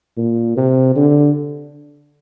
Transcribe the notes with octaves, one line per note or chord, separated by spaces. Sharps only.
A#2
C3
D3